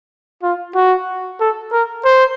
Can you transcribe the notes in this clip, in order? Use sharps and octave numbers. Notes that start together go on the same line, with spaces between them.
F4
F#4
A4
A#4
C5